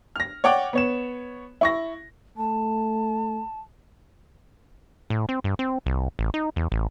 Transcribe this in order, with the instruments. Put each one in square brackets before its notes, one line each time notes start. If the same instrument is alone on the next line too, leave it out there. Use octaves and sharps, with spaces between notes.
[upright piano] F6 A#6
C#5 D5 F#5 G5 D6
B3 C#5 E7
E4 C#6 A#6
[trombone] A3 [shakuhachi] A5
[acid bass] A2
C4
G2
C4
C2
A1
D#4
E2
A1